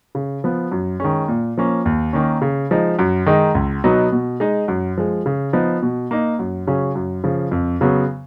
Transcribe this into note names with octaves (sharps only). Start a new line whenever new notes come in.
C#3
F3 B3
F#2
D#3 G#3 C#4
A#2
F3 A#3 C#4
D#2
D#3 A#3 C#4
C#3
F3 G#3 D#4
F#2
D#3 G#3 D#4
C#2
B2 F#3 B3 D#4
B2
G#3 D#4
F#2
F3 G#3
C#3
F3 B3 D#4
B2
A#3 D#4
F#2
C#3 F#3 C#4
F#2
C#3 F3
F2
C#3 F#3 B3